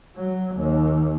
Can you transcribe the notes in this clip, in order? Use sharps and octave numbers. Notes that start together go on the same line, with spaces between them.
F#3
D#2